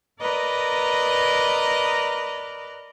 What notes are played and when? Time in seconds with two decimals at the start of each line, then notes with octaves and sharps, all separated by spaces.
0.21 A#4 B4 D5 D#5 A#5